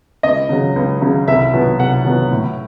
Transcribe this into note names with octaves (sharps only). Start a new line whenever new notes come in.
C#2 D#5
C#3 F#3
C#2
C#3 F#3
C2 E5
B2 F#3 B3
C2 F#5
B2 F#3 B3
A2